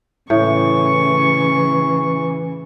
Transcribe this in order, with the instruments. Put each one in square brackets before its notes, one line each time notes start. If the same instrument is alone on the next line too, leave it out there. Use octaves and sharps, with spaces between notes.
[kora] A2 [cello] C#3 [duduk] E3 [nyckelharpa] C#6